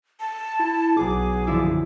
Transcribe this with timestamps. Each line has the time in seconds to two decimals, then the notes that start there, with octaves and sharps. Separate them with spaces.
0.20 A5
0.59 E4
0.97 B1 F#3 G#4 D6
1.47 F#2 D3 F3 E4